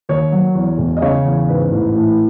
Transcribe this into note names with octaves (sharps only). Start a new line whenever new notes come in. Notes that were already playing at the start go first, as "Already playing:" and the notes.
D#2 C#5
F#3
E2
E1
D#5
C#3 C#5
E2
G#2 B4
A1
A2